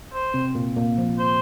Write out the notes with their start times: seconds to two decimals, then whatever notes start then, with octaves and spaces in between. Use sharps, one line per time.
0.13 C5
0.34 C3 C4
0.55 A#2 A#3
0.76 A#2 A#3
0.98 F3
1.19 C5